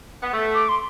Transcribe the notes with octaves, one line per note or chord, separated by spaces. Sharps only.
B3
A3
D6
C6